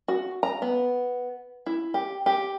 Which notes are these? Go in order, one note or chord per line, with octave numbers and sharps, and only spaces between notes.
F#4
A#5
B3
E4
G4
G4